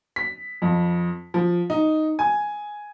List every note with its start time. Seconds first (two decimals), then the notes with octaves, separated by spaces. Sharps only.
0.16 B6
0.62 F2
1.34 F3
1.70 D#4
2.19 G#5